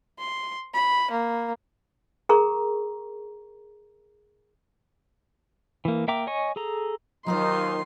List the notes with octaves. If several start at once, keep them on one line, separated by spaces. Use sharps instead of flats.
C6
B5
A#3
G#4 A#4 A#5 C#6
E3 A#3
A#3 E5 G5 A#5 D6
C#5 D#5 G#5 C#6
G#4 A4 A#5
D#2 D#3 F#3 D#4 F4 C5 C6